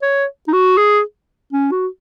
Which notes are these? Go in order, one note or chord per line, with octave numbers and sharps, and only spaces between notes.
C#5
D#4
F#4
G#4
C#4
F#4